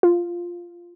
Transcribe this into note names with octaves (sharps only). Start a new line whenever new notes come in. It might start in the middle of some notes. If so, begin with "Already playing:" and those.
F4